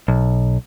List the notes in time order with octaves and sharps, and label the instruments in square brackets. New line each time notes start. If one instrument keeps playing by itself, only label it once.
[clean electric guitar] B1